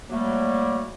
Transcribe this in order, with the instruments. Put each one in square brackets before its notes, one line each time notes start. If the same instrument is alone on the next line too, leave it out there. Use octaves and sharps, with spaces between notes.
[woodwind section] F#3 G3 A3 A#3